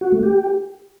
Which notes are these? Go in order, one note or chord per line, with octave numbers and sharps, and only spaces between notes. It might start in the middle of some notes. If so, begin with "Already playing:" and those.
F#4
A3
G4